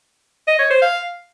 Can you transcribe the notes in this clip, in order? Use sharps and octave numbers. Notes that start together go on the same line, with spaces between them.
D#5
C#5
C5
F5